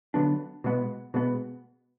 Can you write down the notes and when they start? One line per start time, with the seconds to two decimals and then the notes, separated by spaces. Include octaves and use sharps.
0.14 D3 F#3 B3 D4
0.64 B2 G#3 B3
1.14 B2 G#3 B3